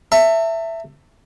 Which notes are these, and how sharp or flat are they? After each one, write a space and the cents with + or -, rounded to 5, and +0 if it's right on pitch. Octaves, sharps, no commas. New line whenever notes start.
E5 +5 A5 +40